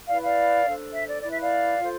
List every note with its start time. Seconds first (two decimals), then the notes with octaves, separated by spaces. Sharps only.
0.09 E4 B4 D5 F5
0.23 D5 F5
0.66 D4 A4 C5
0.94 E5
1.08 D5
1.22 E4 B4 D5
1.32 E5
1.41 D5 F5
1.79 F4 A4 C5